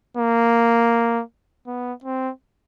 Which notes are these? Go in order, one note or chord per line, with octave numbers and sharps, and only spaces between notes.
A#3
B3
C4